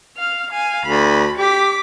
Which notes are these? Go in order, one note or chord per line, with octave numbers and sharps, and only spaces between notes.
F5 F6
F5 G#5
D2 B5
G4 D6 B6